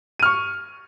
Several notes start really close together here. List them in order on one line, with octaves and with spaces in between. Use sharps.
D#7 F6 C#6